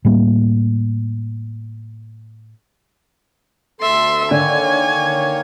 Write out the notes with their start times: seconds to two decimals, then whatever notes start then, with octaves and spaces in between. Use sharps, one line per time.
0.05 A2 G3 A#3
3.80 D2 A4 E5 C6
4.31 D3 D#3 A#3 C#5 G#5